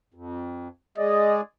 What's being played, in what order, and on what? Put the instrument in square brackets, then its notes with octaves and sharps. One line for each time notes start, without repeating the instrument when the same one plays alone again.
[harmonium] F2
[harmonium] G#3 G#4 D5 [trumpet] D#5